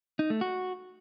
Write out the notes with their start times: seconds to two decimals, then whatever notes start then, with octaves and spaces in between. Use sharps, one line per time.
0.19 D#4
0.30 A3
0.41 F#4